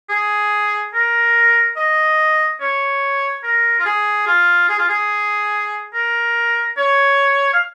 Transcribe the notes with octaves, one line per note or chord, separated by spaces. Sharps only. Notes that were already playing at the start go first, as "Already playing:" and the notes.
G#4
A#4
D#5
C#5
A#4
F4
G#4
F4
G#4
F4
G#4
A#4
C#5
F5